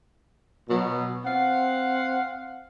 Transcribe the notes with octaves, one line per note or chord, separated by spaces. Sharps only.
B2 F#3
C4 F5 F#5